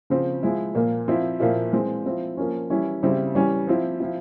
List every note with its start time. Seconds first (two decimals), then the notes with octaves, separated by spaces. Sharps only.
0.10 C#3 F3 C4
0.43 F3 G#3 E4
0.75 A#2 F3 A#3
1.08 F3 C4 E4
1.40 A#2 F3 A#3 E4
1.72 E3 G#3 C4
2.06 F3 C4 E4
2.37 F3 A#3 C#4
2.70 E3 G3 C#4 E4
3.03 C#3 G3 C4 E4
3.35 E3 G3 C#4
3.67 F3 C4 E4
4.00 F3 C4 E4